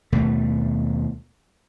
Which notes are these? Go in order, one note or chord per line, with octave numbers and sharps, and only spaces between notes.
D#2 B2 G3 A3